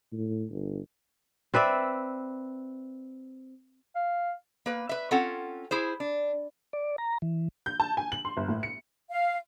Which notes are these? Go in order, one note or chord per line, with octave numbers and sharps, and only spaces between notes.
A2
G1
C4 B4 D5 E5
F5
A#3 B4
B4 E5
C4 C#4 F4 A4 F#5
E4 G#4 C5
D4
D5
A#5
E3
G6
A5
G#5
F#7
C6
G1
A2
C#7
F5